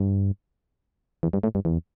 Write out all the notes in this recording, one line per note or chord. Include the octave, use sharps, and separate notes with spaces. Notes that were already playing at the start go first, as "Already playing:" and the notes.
Already playing: G2
E2
G2
A2
G2
E2